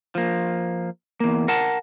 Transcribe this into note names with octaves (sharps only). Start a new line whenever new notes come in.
F3 A#3
E2 A#3
A#4 F#5 A5